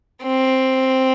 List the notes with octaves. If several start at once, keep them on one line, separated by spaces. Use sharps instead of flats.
C4